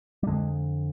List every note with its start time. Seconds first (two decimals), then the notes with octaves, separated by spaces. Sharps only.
0.23 G3
0.27 F2 D3 G#3